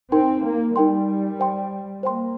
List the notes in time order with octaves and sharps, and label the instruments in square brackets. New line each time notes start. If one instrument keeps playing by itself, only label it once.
[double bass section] C4 [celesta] D#4 A#4 G5 C6
[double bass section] A#3
[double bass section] G3 [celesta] D#4 A#4 G5 C6
[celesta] C5 G5 C6
[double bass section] A#3 [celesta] C5 G5 C6